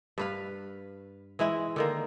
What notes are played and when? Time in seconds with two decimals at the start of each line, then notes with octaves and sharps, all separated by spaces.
0.18 G2 B4 F5
1.39 E3 G#3 E4
1.76 D3 D#3 A#3